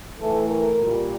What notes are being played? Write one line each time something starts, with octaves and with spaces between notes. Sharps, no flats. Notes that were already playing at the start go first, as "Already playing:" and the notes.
A2 E3 A3 A4
A#4
A#2 G3